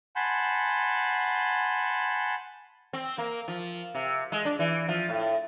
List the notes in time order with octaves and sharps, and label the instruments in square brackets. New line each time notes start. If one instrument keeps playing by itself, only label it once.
[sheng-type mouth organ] F#5 G#5 A5 B5 C6 G6
[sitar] C4
A#3
F3
C3
G#3
D4
E3
F3
A2